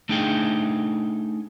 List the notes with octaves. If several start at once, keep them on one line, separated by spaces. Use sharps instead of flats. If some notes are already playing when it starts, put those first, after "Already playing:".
A3 D4 D#4 G#4 G5